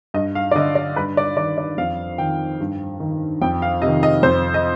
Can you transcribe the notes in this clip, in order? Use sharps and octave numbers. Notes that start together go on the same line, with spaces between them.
G2 D#5
F5
D5
D3 D#5
D5
G2 B4
D5
D#3 D5
D5
F2 F5
D#3 G5
G2
D#3
F2 G5
F5
C3 D#3 D#5
D#5
F2 C5
D#5